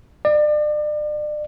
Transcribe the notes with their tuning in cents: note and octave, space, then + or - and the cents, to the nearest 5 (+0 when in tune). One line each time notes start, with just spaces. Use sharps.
D5 +35